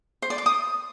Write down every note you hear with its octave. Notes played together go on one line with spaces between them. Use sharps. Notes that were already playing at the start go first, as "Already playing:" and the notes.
C5
D5
D6
D#6